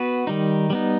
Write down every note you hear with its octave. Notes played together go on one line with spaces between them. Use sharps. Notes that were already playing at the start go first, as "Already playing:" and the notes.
Already playing: B3 F#4 B4
D#3 G3 D#4
G3 B3 D#4